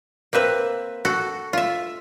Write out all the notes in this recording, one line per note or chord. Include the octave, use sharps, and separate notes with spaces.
A#3 C4 B4 E5
F#4 A4
F4 E5